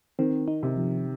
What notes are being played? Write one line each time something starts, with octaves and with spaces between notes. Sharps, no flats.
D#3 C4
D#4
C3
F3